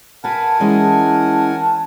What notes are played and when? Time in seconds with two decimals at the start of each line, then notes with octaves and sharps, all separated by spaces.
0.24 F#4 A#4 B4 F#5 G#5 A5
0.60 E3 G#3 C#4